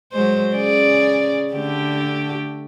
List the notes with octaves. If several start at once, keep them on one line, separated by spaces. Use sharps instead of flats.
F#3 G#3 C5
C#3 G#4 D5
D3 A3 G4